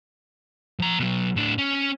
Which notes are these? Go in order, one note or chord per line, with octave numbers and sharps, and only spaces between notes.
F3 A#5
B2 F#3
A2 D4
C#4